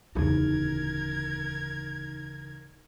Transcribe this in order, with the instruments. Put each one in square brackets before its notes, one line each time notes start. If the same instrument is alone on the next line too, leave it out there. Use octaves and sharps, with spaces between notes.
[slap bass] D1 A2 [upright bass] E2 C#3 [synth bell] D#4 [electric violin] A#4 G#6